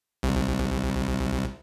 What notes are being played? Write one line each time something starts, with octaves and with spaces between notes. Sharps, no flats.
C2